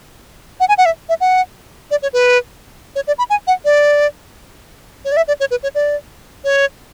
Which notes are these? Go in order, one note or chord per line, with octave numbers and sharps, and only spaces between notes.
F#5
G#5
F#5
E5
E5
F#5
D5
C#5
B4
C#5
D5
B5
G#5
F#5
D5
C#5
D5
E5
D5
C#5
B4
C#5
D5
C#5